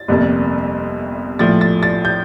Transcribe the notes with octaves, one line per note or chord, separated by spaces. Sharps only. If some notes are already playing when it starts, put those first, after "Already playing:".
Already playing: A6
G1 F2 C3 G3 A#3
A#1 A2 F3 A3 A6
A6
A6
G6